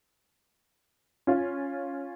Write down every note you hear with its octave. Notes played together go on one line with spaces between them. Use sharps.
C#4 F4